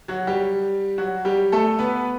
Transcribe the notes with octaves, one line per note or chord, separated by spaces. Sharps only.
F#3 F#4
G3 G4
F#3 F#4
G3 G4
A3 A4
B3 B4